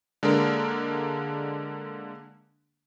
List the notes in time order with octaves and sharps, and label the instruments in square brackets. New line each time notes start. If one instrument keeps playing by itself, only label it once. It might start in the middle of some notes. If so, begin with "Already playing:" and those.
[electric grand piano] D3 G#3 A#3 D4 A#4